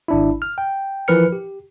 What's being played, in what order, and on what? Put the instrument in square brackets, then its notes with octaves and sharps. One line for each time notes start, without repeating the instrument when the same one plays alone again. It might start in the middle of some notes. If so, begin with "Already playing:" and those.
[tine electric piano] G#1 D4 E4
F6
G5
E3 F3 A#4 B4 F6 C#7
G4